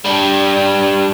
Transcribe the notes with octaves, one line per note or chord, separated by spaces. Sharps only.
G3 D4